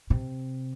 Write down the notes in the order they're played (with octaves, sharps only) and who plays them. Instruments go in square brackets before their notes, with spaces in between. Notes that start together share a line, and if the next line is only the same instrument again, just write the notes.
[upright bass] C3